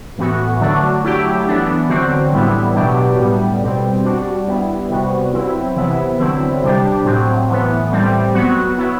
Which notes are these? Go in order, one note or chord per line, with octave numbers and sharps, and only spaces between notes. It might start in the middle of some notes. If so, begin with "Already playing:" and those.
A2 E3 B3 F#4
D3 F#3 A3 D4 F#4
F#3 A3 E4 G4
E3 B3 D4
D3 F#3 C4 F#4
A2 E3 G3 B3 E4
B2 F#3 B3 D4 G4
A2 G3 B3
B2 G3 C4
G3 D4 F#4
G3 B3 E4
C3 G3 B3 F#4
F#3 C4 E4
C3 E3 B3 E4
D3 F#3 C4 E4
C3 G3 D4 G4
A2 F#3 C4
A2 E3 B3
A2 G3 C4
F#3 B3 F#4
F#3 B3 E4